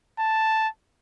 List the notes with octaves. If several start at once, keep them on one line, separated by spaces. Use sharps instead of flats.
A5